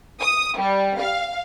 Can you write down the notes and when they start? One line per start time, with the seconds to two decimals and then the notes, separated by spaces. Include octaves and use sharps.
0.20 D#6
0.58 G3
1.01 F5